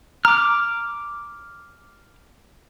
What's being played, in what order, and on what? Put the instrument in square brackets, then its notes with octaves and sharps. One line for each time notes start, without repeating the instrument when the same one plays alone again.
[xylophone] A#5 [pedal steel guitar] D6 F6